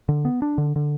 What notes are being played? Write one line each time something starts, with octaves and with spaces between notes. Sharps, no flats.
D3
B3
D4
D3
D3